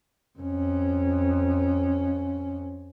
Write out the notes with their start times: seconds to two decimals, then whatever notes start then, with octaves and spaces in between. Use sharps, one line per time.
0.39 F2 C#4